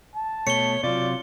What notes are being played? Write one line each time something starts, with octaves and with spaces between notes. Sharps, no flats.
A5
B2 A3 C#5 C#7 G7
C3 F#3 F4 D5